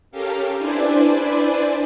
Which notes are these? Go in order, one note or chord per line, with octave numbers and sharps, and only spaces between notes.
C#4 G4 A4 A#4 F5
D4 E4 B4 C5 D5 G#5